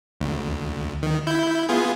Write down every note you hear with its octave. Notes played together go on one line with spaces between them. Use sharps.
D2
D#3
E4 G6
B3 F4 G#4